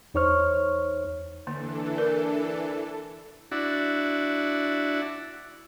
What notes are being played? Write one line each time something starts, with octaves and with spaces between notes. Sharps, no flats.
E2 D#4 C5 C#5 C#6 F6
D3 E3 A#3 D4 A4
A#4
D4 E4 F#4